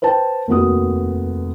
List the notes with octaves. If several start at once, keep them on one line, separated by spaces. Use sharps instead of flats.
B4 C5 G5 A5
F1 D#2 B3 F#4 D#6